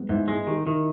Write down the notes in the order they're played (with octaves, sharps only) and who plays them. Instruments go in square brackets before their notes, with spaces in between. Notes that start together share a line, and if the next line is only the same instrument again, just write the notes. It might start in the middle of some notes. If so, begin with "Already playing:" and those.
Already playing: [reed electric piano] G#3 B3
[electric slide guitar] G#2 [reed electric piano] E4
[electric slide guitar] G#3
[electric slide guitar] D#3 [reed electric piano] G4
[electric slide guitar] D#3 [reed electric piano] E4